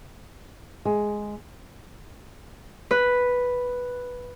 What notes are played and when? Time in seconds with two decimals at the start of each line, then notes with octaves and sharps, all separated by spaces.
0.85 G#3
2.91 B4